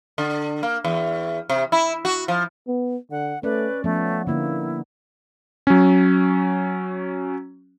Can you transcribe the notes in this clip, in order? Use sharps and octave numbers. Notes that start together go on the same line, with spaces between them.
D3
A#3
E2
C3
E4
F#4
F3
B3
D3 F#5
A3 C#4 B4 D5
F3 A3 B3 C#4
D3 A#3 E4
F#3 C#4